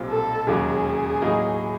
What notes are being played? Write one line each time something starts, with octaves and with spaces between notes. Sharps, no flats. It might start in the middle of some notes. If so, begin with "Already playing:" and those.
Already playing: B1 A#2 G3 C4 F4
A4
E1 D#2 C#3 F#3 A#3 G#4
A2 F#3 A#3 D#4